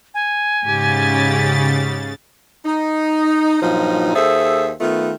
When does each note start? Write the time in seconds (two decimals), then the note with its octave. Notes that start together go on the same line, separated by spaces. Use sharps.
0.14 G#5
0.65 G#2 C#3 G4 A6
2.65 D#4
3.62 G2 A#2 F3 F#3 D#4
4.15 D#2 G#4 A4 C5 E5
4.81 D#3 A3 B3 F4